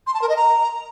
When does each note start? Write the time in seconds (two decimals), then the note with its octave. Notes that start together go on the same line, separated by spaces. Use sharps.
0.07 C6
0.14 A5
0.22 A#4
0.29 D#5
0.36 A#5